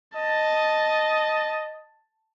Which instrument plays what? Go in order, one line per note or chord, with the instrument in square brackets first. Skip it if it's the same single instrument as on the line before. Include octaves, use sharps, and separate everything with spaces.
[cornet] D#5 [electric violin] A5